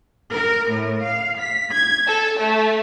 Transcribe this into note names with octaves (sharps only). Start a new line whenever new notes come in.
A#4
A2
F5
B6
G#6
A4
A3